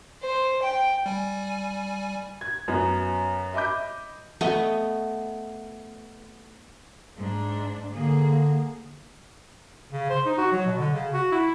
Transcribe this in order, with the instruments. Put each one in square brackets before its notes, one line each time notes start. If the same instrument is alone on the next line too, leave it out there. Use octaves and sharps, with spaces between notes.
[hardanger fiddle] C5
G5
[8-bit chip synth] G3 G#5
[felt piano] G#6
F#2 B3
D#5 E5 B5 D6 G6
[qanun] A3 B3 D#5 C#6
[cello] G#2 D4
[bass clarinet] D3 [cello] A#3 G#4
[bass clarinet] C#3
C5
D#4
F#4
F#3
B2
D3
C#3
F#4
E4